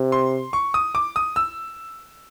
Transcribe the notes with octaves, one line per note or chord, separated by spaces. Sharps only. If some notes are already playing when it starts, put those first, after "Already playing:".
Already playing: C3
C6
C#6
D#6
D6
D#6
E6